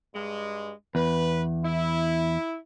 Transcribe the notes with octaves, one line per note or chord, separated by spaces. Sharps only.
G2 G#3
E2 B4
E4